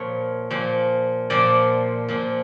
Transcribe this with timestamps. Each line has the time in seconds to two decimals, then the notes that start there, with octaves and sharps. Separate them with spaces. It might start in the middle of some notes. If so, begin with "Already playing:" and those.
Already playing: A#2 F3 C#5
0.50 A#2 F3
1.30 A#2 F3 D5
2.09 A#2 F3